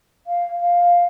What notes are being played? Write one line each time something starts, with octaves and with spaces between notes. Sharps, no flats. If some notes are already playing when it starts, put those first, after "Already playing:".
F5
F5